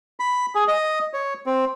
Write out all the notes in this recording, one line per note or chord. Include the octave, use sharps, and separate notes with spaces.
B5
G#4
D#5
C#5
C4